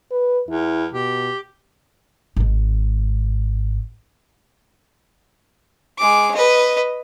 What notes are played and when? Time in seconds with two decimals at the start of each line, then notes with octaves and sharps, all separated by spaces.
0.11 B4
0.49 E2 E4
0.93 B2 G4
2.36 G#1 G#2
5.99 G#3 D6
6.35 B4 D#5